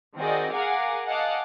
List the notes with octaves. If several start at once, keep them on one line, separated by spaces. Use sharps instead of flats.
D#3 C4 F#4 G#4 D5 D#5
G#4 A#4 F5 F#5 G#5 D6
D#5 F5 F#5 G#5 A5 D6